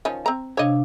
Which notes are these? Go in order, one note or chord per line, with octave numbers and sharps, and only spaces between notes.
D#3 F3 C#4
C4 A#5
C3 D4 C#5 D#5 F5